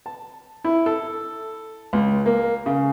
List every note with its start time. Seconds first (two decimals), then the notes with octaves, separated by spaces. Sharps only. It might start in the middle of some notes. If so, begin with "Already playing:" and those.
0.06 A5
0.64 E4
0.86 A4
1.93 C#2
2.26 A#3
2.66 C#3